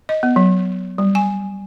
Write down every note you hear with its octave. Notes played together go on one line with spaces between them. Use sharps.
D#5
B3
F#3
G3
G#5